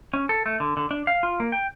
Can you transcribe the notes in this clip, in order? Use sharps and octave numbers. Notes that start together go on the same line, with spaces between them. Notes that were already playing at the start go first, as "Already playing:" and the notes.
C#4
A4
A3
D3
D3
D4
F5
F4
A#3
G5